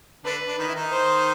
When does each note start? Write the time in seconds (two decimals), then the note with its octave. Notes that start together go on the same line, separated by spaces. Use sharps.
0.24 D3 D4 B4
0.47 D4
0.58 D#3 D#4
0.67 E4
0.74 D#3 D#4
0.91 C5